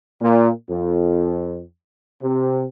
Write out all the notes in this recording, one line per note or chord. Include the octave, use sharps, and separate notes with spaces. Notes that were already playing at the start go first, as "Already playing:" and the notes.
A#2
F2
C3